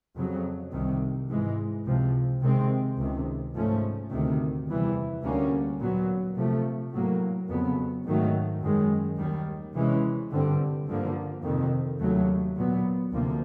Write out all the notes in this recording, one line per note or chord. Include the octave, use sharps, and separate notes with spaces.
F2 C#3 F#3
C2 C3 D#3
G#2 E3 G#3
C#2 C3 F3
C3 D#3 G#3 C4
C#2 C3 D#3
G#2 F3 A3 C#4
D2 C3 D#3
E2 C3 E3 G3
D2 D3 G3 A#3 C#4
A#2 F#3 B3
C3 F3 A3
A2 F#3 A#3
F2 C#3 F#3 B3
G#2 D#3 F#3 A3
F#2 D#3 G#3
D#2 D#3 G3
C3 E3 G#3 C#4
G2 D3 G3 C4
G2 D3 F3 A#3
F2 C3 D#3
D#2 C#3 F#3 A3
A#2 F#3 B3
D2 C3 F3 A#3